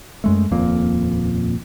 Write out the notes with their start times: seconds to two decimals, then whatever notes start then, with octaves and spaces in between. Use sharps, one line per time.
0.24 F#2 G#3 A3
0.51 D#1 F2 A#2 A#3